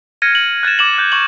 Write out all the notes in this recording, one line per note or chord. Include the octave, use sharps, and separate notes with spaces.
F6 G#6 A#6 C#7 D#7
F#7
F#6 G#6 A6 E7
D6 E7 F#7
F#6 G6
C#6 F#7